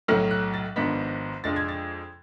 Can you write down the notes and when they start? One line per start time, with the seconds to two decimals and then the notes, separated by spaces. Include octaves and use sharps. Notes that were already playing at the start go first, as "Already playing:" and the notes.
0.08 B1 A2 F#3 A3 F6
0.31 F#6
0.54 A6
0.76 G#1 G#2 F3 B3 D4 B6
1.44 F2 F3 G#3 D4 A6
1.56 G#6
1.69 A6